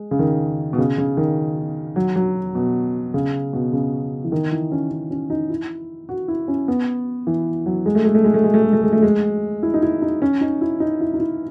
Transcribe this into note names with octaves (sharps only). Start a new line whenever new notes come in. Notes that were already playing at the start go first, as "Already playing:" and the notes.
Already playing: G#3
C#3
D#3
B2
C#3
C#3
D#3
F#3
F#3
B2
C#3
B2
C#3
E3
D#3
E3
C#4
C#4
C#4
D#4
E4
F#4
E4
C#4
B3
E3
F#3
G#3
A3
G#3
A3
G#3
A3
G#3
A3
G#3
A3
G#3
A3
G#3
E4
D#4
E4
D#4
C#4
D#4
E4
D#4
E4
D#4
E4